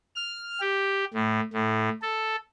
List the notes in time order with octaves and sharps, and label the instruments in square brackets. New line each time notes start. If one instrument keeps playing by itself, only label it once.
[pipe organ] F6
G4
A2
A2
A4